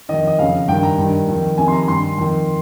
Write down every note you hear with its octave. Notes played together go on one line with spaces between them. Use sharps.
F2 D#3 D#5
D#5
F2 C#3 F5
G2 D#3 G5
A#5
G2
D#3
F2 D#3
F2 C3 D#3 G#5
C6
A#5
A#5
G2 D#3 C6
F2 D#3